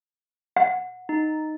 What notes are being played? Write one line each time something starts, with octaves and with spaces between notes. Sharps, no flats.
F#5
D#4